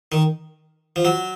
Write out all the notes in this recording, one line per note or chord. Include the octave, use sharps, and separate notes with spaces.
D#3
F3
F#3